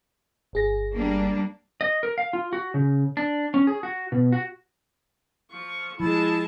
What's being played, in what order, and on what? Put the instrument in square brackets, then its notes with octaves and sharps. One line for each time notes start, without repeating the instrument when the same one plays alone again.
[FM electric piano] G1 G#4 A#6
[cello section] G3 A#3 D4
[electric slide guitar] D#5
A#4
F5
F4
F#4
C#3
D4
C#4
G#4
F#4
B2
F#4
[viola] F3 C#6
[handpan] F3 [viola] G#3 A5 [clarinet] E4